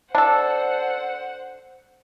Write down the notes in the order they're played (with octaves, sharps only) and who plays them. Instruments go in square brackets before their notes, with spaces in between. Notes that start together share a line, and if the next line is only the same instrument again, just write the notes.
[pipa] D4 A4 [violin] C5 F#5